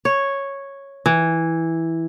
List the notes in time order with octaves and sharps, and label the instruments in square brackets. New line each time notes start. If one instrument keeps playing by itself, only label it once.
[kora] C#5
E3